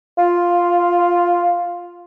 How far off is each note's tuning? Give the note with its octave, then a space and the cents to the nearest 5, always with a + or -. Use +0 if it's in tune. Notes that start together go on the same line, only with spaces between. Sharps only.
F4 +0